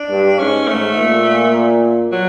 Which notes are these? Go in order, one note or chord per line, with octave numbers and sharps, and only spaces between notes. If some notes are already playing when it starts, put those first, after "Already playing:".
Already playing: D4
G2
G#2 C#4
G#2 A3
A#2
F#3